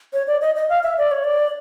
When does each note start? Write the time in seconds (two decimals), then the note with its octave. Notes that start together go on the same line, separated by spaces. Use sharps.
0.13 C#5
0.27 D5
0.41 D#5
0.56 D#5
0.69 F5
0.83 E5
0.98 D5
1.11 C#5
1.24 D5